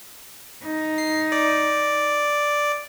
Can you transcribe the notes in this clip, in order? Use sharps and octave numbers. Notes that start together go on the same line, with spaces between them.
D#4
C7
D5